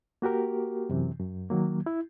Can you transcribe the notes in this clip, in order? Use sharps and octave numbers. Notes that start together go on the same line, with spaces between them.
A#3 F#4 G4 A#4
F#2 C3 E3
F#2
D#3 F#3 A#3
E4